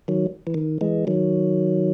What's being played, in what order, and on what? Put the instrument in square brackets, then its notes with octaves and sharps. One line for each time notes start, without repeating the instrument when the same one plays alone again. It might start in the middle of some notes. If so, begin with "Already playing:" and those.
[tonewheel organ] D#3 F#3
E3
D#3
E3 G#3
D#3 F#3